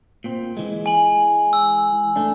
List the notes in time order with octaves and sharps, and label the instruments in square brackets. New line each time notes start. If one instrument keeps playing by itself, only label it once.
[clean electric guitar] A#2 C4
E3 G#3
[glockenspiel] G#5 F#7
E6
[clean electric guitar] A3 D4